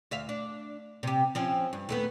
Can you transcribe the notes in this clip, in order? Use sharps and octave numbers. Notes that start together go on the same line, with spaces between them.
D2 E5 F5
D4
C3 G4
F3 C4 C#4
G2
D#2 A3 B3